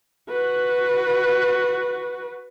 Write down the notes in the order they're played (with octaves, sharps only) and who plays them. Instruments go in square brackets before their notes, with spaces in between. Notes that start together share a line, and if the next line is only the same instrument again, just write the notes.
[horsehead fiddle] F#4 B4